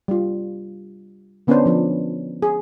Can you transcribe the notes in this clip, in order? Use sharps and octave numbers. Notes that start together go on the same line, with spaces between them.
G3 F4
D3 B3 C#4 D4 B4 C5
F3 D4 C5
G#4